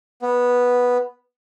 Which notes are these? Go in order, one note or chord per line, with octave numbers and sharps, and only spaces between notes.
B3